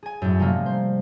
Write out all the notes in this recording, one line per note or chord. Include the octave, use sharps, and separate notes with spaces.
G#4 G#5
F#2 A2
C3 F3 G3 A3 A#3 C#4
C5